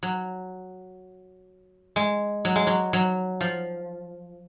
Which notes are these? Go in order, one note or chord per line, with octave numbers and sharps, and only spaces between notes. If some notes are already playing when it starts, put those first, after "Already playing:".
F#3
G#3
F#3
G#3
F#3
F#3
F3